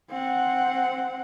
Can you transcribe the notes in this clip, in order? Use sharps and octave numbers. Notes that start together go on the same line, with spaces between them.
C4 F#5